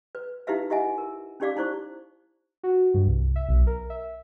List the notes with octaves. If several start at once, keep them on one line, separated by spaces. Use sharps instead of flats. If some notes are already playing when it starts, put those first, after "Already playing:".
B4
D#4 E4 G4 B4 E5 F5
E4 G4 D#5 E5 F#5 G#5
A#4
C#4 D#4 G4 D5 F5 D6
D#4 E4 C5 C#6
F#4
G2
C2
E5
B1
A#4
E5